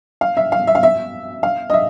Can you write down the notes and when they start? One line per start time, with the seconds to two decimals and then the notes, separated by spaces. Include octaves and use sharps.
0.21 F5
0.37 E5
0.52 F5
0.67 E5
0.75 F5
0.83 E5
1.43 F5
1.70 D#5
1.73 E5